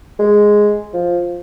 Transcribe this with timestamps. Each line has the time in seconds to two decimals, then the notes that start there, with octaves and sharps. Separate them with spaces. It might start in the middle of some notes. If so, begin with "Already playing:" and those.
0.20 G#3
0.94 F3